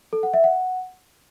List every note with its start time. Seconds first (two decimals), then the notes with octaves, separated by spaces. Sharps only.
0.13 A4
0.23 F#5
0.34 E5
0.44 F#5